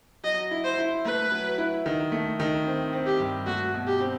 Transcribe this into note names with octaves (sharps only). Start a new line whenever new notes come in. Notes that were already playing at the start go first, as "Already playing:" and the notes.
F#3 D#5
E4
C5
E4
A3 B4
F#3
E4
D#3
A3
D#3
C4
C4
G4
G2
A3 F#4
B2
G4
C4